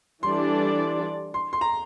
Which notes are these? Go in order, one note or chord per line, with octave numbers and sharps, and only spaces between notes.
E3 G3 D4 A4 D5 C6
C6
C6
A#5